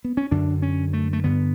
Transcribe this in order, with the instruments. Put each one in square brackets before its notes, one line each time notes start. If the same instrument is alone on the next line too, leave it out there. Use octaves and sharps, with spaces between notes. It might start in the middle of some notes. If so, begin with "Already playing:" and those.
[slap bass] B3
C#4
F#2 D3 D4
C#4
A3
A3
G2 D3 B3